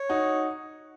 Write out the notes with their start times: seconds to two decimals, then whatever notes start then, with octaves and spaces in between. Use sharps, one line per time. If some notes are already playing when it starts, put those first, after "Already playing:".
Already playing: C#5
0.09 D#4 F#4